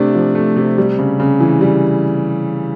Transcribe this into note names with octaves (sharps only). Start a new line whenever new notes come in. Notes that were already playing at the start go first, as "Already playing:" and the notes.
Already playing: C3 A3 D4
F3
A3
C3
G3
C#3
C#3
E3
G3